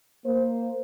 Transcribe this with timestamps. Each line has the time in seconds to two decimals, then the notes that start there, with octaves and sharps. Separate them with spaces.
0.25 A#3 C5